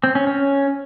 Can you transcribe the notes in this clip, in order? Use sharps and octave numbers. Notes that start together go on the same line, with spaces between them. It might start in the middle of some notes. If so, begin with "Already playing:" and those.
C4
C#4
C#4